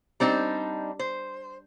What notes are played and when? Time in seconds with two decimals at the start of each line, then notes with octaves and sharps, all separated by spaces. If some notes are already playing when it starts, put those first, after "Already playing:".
0.20 G3 C4 D4 D#4
0.99 C5